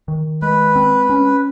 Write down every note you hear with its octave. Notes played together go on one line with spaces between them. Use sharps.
D#3
G#3 B4
C4
C#4